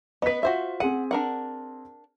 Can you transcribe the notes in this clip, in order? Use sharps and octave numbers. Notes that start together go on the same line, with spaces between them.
B3 B4 D#5 B6
F4 F#4 C5 E5
C4 G#4 F#5 D#7
D4 A#4 F#5